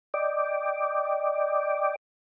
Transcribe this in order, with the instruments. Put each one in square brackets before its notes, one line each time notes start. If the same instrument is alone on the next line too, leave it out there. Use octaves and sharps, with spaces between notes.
[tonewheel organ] D5 D#5 G5 D6